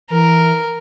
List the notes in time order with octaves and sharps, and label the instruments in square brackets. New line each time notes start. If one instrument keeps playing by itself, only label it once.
[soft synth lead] E3 [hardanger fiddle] A#4